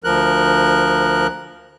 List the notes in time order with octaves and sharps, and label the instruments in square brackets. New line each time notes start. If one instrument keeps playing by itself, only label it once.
[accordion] D2 F3 A#4 F#6